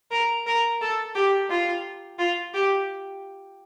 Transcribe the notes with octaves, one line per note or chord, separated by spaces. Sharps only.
A#4
A#4
A4
G4
F4
F4
G4